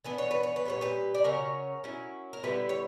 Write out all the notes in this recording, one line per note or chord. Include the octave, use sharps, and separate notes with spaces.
E3 B3 D4 B4
C#5
B4
C#5
B4
A#2 G3 B3 C#5
G4 B4
D5
C#3 F#3 C#4 A#4 C#5
F#3 C#4 E4
A#4
D3 G3 B3 E4 G4 B4
C#5